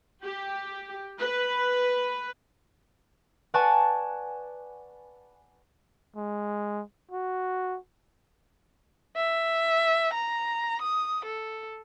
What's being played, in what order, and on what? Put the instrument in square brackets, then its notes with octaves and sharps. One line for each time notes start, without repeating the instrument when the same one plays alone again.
[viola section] G4
B4
[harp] B4 D5 F#5 G#5 A5 C#6
[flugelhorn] G#3
F#4
[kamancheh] E5
A#5
D#6
A4